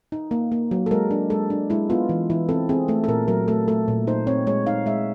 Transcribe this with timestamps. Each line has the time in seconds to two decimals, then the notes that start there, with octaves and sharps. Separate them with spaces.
0.12 D#4
0.31 A#3
0.52 A#3
0.71 F#3
0.86 A4
0.91 G#3 A#4
1.11 D4
1.30 G#3 A4
1.50 D4
1.70 G#3 E4
1.90 B3 F4
2.09 E3
2.30 E3 E4
2.49 C4 A4
2.69 C4 G#4
2.88 A3 A4
3.04 A4
3.08 A#2 A#4
3.28 F#3 A#4
3.48 A3 A4
3.68 A3 A4
3.88 A#2
4.07 D#4 C5
4.27 C4 C#5
4.47 G#3 C#5
4.66 D#4 F5
4.86 G#3 E5